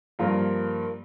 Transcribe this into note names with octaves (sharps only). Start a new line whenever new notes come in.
G2 F3 A#3 F4 A#4